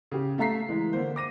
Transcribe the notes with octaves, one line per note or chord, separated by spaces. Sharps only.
C#3 G4
A3 E5 F5 A#5 B6 C7
E3 G#3
D3 A#3 C5
D6 A#6 D#7